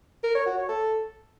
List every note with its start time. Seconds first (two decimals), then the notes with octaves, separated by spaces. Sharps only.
0.24 A#4
0.35 C#5
0.46 F#4
0.58 C#5
0.69 A4